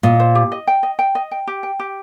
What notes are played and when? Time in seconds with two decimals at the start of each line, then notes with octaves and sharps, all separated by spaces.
0.03 A#2 D#5
0.20 C5
0.35 G4
0.52 D#5
0.67 G5
0.83 D#5
0.99 G5
1.15 D#5
1.31 G5
1.47 G4
1.63 G5
1.79 G4